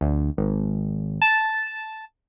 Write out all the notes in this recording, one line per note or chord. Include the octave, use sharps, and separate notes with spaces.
D2
G#1
A5